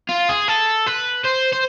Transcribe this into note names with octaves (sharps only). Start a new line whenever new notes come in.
F4
G#4
A4
B4
C5
C5